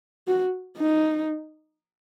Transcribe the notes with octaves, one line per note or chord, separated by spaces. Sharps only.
F#4
D#4